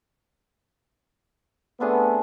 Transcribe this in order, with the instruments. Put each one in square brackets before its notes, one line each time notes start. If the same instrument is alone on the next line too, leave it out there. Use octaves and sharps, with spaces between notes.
[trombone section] A3 B3 [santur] C4 D4 G#4